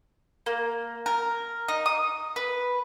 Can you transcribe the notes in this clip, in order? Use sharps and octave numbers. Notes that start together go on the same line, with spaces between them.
A#3
A#4
D#4
D#6
B4